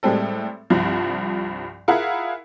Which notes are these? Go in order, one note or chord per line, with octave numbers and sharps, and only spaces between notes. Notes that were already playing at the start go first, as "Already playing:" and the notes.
A2 G3 G#3 C4 A4
C2 G2 F3
E4 F4 G#4 A#4 F5 F#5